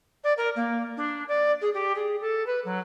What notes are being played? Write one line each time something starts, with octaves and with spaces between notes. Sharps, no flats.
D5
A#4
A#3
D4
D5
G#4
G4
G#4
A4
B4
F#3